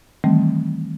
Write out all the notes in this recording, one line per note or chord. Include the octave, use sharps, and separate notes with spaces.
D#3 E3 G3 A3 C4